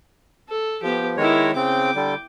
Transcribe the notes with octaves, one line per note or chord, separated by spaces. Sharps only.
A4
F3 B3 G4
D#3 G#3 E4 A#4 C#5
C#3 C4 G5 D6
D3 G3